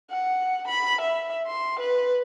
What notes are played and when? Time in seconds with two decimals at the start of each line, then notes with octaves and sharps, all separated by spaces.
0.11 F#5
0.68 B5
1.01 E5
1.47 C6
1.80 B4